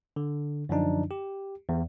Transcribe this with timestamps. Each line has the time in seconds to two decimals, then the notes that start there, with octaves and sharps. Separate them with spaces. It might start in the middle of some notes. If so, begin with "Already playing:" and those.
0.16 D3
0.69 F#2 D3 F3 D4 D#4
1.11 G4
1.69 E2